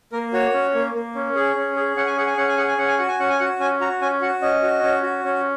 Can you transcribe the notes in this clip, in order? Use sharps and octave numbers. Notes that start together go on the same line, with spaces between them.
A#3 A#4
F#4 C#5
C#4
A#3
A#3
C#4
G#4
C#4
G#4
C#4 F#5
G#5
G#4 F#5
G#5
C#4 F#5
G#5
G#4 F#5
G#5
C#4 F#5
G#5
F#4 F#5
G#5
C#4 F#5
G#5
F#4 F#5
C#4 G#5
F#4 A#5
C#4 G#5
F#4 F#5
C#4 D#5
F#4
C#4
F#4
C#4